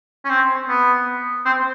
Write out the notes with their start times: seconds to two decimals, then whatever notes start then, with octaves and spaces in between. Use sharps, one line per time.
0.25 C#4
0.30 C4
0.69 B3
1.46 C4